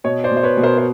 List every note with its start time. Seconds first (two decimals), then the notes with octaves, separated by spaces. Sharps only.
0.04 B2 C#5 D#5
0.24 C5 D5
0.31 B2
0.37 C5
0.43 B4 C#5
0.57 B2
0.63 A#4 C5
0.78 C5